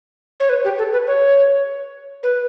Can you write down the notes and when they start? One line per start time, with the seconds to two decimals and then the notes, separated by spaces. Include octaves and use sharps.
0.40 C#5
0.49 B4
0.64 G4
0.78 A4
0.93 B4
1.07 C#5
2.23 B4